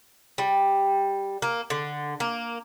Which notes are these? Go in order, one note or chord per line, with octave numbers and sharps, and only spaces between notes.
G3
A#3
D3
A#3